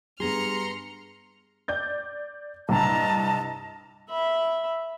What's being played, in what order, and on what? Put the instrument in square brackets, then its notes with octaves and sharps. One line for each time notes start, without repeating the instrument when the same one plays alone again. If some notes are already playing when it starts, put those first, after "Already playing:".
[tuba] G2 [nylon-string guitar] B3 G#4 [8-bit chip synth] A#5 C6 [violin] F6 C#7
[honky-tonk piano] D5 G6 A6
[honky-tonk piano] C2 G2 [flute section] D#5 A5 A#5
[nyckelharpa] E5 B5